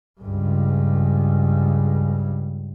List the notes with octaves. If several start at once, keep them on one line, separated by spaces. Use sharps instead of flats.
C#2 G2